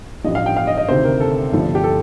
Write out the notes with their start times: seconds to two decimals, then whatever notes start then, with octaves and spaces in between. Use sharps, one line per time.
0.24 A1 G2 F3 D#5
0.35 F5
0.46 G5
0.57 F5
0.67 D#5
0.78 D#5
0.88 D2 C3 D#3 C5
1.04 A#4
1.20 A4
1.52 G1 G2 D3 F3
1.75 G4
1.84 A4